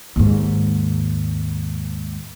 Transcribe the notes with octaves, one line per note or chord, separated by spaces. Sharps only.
D#2 G#2